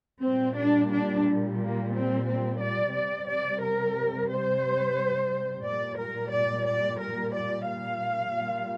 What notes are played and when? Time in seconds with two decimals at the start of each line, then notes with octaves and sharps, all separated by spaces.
0.23 A#2 G3 C4
0.57 D4
0.92 D4
1.59 A#3
1.93 C4
2.27 C4
2.61 D5
2.94 C3 G3 D5
3.28 D5
3.62 A#4
4.30 C5
5.65 A#2 G3 D5
5.99 A#4
6.33 D5
6.67 D5
7.00 A#4
7.34 D5
7.68 F5
8.36 A#2 G3